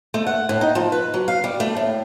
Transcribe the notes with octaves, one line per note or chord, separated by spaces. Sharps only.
A3
F#5
A2
D#4
F3
B4
F#3
F5
G3
A3
A2